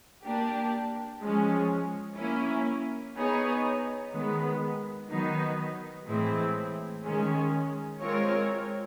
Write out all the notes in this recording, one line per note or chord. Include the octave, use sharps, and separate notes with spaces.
A#3 D4 G4
F3 G#3 C#4
A#3 C#4 E4
B3 D#4 G#4 C#5
D#3 G#3 B3
D#3 F#3 B3 D#4
A2 E3 G#3 C4 E4
D#3 G#3 C#4
G#3 C4 F4 A#4 C#5